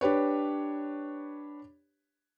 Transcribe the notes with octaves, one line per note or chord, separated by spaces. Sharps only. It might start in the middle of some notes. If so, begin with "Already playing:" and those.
D4 G4 B4 C#5